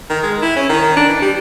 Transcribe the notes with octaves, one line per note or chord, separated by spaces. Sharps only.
D#3
G#3
E4
C#4
D#3
D4
E3
G3